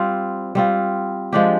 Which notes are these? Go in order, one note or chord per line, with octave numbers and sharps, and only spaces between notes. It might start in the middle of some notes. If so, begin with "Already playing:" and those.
Already playing: G3 C4 F4
G3 C4 F4
F3 G#3 D4 G4